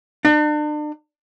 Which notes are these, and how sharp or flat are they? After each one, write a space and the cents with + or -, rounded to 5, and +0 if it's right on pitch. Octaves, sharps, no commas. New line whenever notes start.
D4 +40